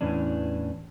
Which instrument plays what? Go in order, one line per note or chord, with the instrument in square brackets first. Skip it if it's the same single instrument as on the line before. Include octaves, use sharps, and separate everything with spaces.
[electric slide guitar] E2 A2 E3 C#4 D4